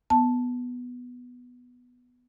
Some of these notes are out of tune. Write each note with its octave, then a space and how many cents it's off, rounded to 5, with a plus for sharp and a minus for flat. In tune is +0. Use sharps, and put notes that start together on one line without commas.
B3 +0 A5 +0